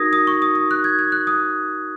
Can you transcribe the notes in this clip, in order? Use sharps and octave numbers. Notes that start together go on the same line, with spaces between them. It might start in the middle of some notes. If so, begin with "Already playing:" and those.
Already playing: D#4 F#4 A#4 D#6 G#6 A#6
D#6
C#6
D#6
D#6
F#6
G#6
G#6
F#6
D#6